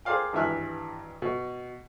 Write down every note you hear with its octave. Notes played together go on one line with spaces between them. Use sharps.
G#4 A#4 C5 D5 F5 G5
G#1 G2 E3 E5 F6 F#6
B2